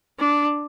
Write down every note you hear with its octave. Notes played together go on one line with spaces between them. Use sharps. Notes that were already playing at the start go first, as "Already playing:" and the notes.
D4